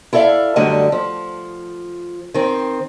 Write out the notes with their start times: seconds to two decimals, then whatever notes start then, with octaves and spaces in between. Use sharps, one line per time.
0.13 E4 A4 D5 E5 F5
0.56 F#2 D3 G3 A3 F#4 D#5
0.92 F3
2.34 D#3 C4